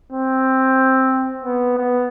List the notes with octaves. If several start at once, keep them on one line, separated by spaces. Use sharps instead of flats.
C4
B3
B3